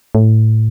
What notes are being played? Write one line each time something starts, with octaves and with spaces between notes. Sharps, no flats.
A2